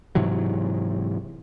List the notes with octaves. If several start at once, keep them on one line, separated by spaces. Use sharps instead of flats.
G#2 C3 E3 F#3